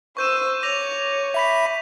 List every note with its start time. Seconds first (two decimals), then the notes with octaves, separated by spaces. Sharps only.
0.17 C5 C#6 E6 G6 D#7
0.63 C#5 D6 A#6 F7
1.34 E5 B5 B6